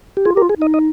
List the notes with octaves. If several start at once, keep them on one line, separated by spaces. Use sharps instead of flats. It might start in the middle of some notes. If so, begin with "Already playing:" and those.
G4
F4 G#4
G4 A#4
F4
G#4
D#4 D#5
D#5